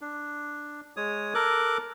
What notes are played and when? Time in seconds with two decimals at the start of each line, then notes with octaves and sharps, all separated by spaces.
0.01 D4
0.97 G#3 C#5 D#6
1.34 A4 A#4 D6 F#6